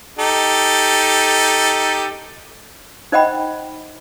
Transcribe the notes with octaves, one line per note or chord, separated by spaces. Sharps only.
D#4 G4 A4
D#4 C5 D#5 F#5 G5 B5